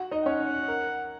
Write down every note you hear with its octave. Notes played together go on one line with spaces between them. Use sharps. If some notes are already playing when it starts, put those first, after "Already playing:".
Already playing: F#4 F#5
D#4 D#5
C#4 C#5 F#5
A#4